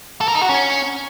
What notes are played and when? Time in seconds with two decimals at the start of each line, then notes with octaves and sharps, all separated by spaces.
0.21 A4
0.28 A#4
0.35 D#4
0.42 F#4
0.49 C#4